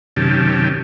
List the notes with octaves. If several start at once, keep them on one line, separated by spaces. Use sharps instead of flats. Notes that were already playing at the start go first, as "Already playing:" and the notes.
F#2 C3 D#3 C#4 G4 A5